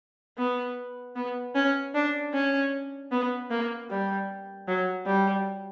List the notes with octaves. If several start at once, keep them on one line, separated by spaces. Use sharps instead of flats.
B3
B3
C#4
D4
C#4
B3
A#3
G3
F#3
G3